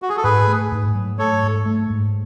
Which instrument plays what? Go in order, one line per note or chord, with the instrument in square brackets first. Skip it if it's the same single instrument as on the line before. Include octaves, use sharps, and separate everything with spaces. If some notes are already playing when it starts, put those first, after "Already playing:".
[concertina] F#4
G#4
A4
[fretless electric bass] G#2 [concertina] G#4 B4
[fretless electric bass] A3
G#2
F#3
[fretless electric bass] A3 [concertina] A4 C#5
[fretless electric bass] G#2
A3
G#2